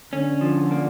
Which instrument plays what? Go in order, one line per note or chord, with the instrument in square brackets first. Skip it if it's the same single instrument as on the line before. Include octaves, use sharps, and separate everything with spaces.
[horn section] D3 [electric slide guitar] C#4
[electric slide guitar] F3
A#3